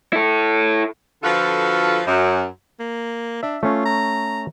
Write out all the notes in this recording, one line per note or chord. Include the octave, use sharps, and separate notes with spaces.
E4 A4
D3 F3 F4 F#4 A4 B4
F#2
A#3
D4 E5
A3 C#4 F4
A#5